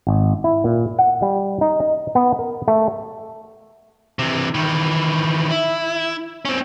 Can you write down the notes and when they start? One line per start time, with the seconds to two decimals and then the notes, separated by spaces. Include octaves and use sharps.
0.07 G#1
0.44 E4
0.64 A#2
0.99 F#5
1.22 G3
1.61 D#4
1.80 D#5
2.15 B3
2.39 A#4
2.68 A3
4.19 C3 E3
4.54 D#3 E3
5.51 E4
6.45 C4 C#4